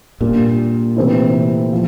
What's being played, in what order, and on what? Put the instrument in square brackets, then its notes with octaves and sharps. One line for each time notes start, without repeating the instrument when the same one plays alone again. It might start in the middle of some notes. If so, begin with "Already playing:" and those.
[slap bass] A#2 [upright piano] G3 A#3 D4
[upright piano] C3 E3 A3 C4 E4
F3